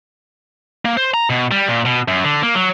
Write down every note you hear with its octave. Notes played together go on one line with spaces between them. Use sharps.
A#3
C5
A#5
B2
G3
A#2
B2
F#2
D3
A#3
F#3